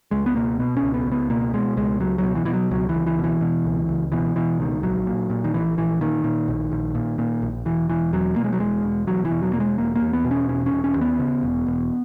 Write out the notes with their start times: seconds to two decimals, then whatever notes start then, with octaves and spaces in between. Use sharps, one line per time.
0.11 C#2 G#3
0.26 B3
0.35 B2 A#3
0.59 B2 B3
0.77 C#4
0.83 C#2
0.94 B3
1.06 C#2
1.12 B3
1.30 B2 A#3
1.53 B2 G#3
1.77 C#2 G#3
2.00 C#2 F#3
2.18 F#3
2.23 B2
2.35 E3
2.45 B2 E3
2.53 F#3
2.71 C#2 F#3
2.89 E3
2.95 C#2
3.07 E3
3.18 B2
3.24 E3
3.41 B2
3.65 C#2
3.89 C#2
4.12 B2 E3
4.36 B2 E3
4.60 C#2 D#3
4.83 A#1 F#3
5.07 A#2
5.30 A#2
5.44 D#3
5.54 A#1 E3
5.77 A#1 E3
6.01 A#2 D#3
6.24 A#2
6.48 A#1
6.72 A#1
6.95 A#2
7.18 A#2
7.42 A#1
7.65 E1 E3
7.89 E1 E3
8.13 E2 F#3
8.36 B2 A#3
8.44 G#3
8.53 F#3
8.60 E1 G#3
8.83 E1
9.07 E2 F#3
9.25 E3
9.31 B2
9.43 F#3
9.53 E1 A#3
9.60 G#3
9.78 E1 A#3
9.95 A#3
10.01 E2
10.13 B3
10.25 B2
10.31 C#4
10.49 E1 C#4
10.66 C#4
10.72 E1
10.84 C#4
10.96 D#2
11.01 B3
11.19 C#3
11.43 E1
11.67 E1